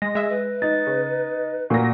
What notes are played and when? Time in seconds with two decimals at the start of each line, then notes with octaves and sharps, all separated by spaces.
0.02 G#3 A#6
0.15 G#3 E5
0.30 B4
0.62 D#4 A6
0.87 C#3
1.70 A#2 F#4 A#4 A#6